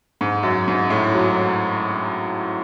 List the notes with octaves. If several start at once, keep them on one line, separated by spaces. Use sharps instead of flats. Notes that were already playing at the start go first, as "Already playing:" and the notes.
G#2
F#2
G#2
A2
F#3